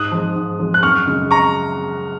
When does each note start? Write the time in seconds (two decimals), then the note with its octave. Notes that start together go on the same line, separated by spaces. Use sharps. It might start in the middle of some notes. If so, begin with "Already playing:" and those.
Already playing: G#2 D#6 F#6
0.12 F3 G#3
0.36 G#2
0.59 F3 G#3
0.74 F#6
0.83 F#2 C#6 F6
1.07 C#3 G#3
1.31 A#5 C#6